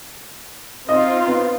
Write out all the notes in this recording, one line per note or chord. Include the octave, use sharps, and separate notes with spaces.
C4 D#4 F4 D#5
B3